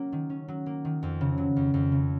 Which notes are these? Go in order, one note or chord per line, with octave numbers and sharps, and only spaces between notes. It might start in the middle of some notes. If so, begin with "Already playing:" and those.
Already playing: F#3 A#3 C#4
D#3
C#4
F#3
A#3
D#3
F2
C#3
F#3
F2
F2
C#3